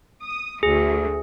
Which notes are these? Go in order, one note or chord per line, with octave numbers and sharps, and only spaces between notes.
D#6
D2 G#4